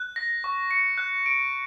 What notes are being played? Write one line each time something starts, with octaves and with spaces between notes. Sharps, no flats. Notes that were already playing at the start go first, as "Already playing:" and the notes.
Already playing: F#6
A#6
C#6
C#7
F#6
D7